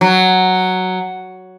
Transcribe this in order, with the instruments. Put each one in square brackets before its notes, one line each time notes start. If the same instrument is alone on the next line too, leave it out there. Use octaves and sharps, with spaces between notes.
[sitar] F#3